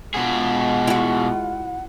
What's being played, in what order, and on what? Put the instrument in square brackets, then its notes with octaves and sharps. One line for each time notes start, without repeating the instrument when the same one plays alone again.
[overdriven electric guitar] B2 G#4 [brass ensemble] G#3 F4 [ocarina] F#5
[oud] E4 F#4